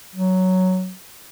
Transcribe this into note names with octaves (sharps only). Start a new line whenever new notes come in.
F#3